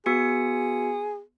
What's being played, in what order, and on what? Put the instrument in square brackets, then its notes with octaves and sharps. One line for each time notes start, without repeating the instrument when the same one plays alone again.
[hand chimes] B3 F#4 C#7 [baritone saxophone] G#4